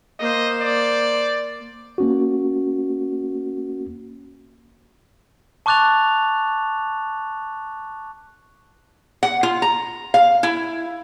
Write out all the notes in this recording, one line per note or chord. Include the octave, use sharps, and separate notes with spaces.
A#3 C5 D#5
D5
A#3 C#4 F#4
A5 C#6 D6 F#6 A6 F7
F#5
F4
A#5
F5
E4